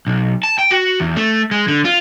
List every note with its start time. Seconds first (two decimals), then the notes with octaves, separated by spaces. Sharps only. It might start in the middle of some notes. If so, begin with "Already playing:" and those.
0.07 B1
0.43 A5
0.59 G5
0.71 F#4
1.00 E2
1.17 A3
1.51 G#3
1.68 D3
1.85 F4